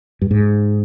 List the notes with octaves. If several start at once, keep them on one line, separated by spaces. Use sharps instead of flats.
G2
G#2